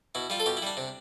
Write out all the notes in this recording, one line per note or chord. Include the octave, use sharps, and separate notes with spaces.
B2 E4
G3 F4
A4
B2 G4
E4
G3 D4
C3